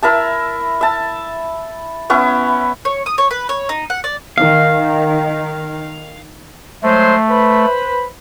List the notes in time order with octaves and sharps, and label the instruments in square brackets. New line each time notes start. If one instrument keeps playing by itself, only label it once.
[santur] E4 A#4 E5 A5
E5 A5
B3 C#4 E4
[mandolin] C#5
D#6
C#5
B4
C#5
D#4
F#5
D5
[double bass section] D#3 [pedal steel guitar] F5
[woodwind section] F#3 G#3 C5 [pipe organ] A3
[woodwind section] B4 C5 B5